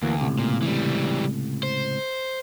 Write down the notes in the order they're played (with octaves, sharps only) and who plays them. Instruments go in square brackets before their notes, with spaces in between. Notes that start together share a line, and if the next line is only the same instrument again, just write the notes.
[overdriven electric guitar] D2 [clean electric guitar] E3 A#3
[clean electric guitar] C#2 A2 C3
[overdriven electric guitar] A#2
E3 G3
C5